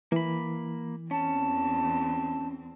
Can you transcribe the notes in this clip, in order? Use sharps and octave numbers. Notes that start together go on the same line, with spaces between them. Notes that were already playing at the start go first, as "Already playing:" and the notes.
E3 A#3 B5
E2 C4 C#4 A5